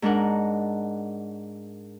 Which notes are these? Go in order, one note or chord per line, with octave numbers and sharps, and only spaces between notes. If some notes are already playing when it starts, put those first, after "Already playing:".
G#2 G#3 D4 A#4 F#5